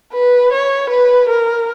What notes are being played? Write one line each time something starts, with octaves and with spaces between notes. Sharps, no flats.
B4
C#5
B4
A#4